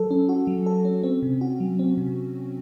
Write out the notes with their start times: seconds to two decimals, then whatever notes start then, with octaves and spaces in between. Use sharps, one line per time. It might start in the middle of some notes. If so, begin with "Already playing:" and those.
Already playing: F#3 A4
0.10 C#4
0.29 F#4
0.47 F#3
0.66 A4
0.85 C#4
1.03 C4
1.22 C3
1.41 F#4
1.60 F#3
1.79 C4
1.98 C3